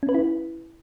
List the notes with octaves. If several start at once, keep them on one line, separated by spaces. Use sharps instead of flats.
C#4
B4
E4